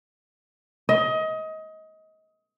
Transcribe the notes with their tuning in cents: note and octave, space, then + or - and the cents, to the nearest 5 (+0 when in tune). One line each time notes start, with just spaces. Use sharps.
D#5 +25